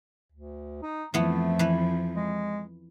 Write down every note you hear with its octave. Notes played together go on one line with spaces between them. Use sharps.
D2
D#4
F2 E3 F3 A3 B3
E3 B4
G#3